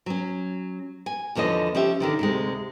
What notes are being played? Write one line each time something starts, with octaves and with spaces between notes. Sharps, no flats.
F#3 C#4
G#5
E2 D3 F3 C#5 D#5
F3 C#4 G4 E5
D3 D#3 F3
D2 C3 G#3